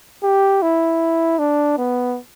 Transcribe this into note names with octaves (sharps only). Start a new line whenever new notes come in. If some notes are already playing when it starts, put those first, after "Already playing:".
G4
E4
D4
B3